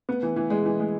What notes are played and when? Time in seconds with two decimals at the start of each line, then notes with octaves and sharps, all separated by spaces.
0.09 B3
0.23 E3
0.36 E3
0.50 G#3
0.66 E3
0.80 G#3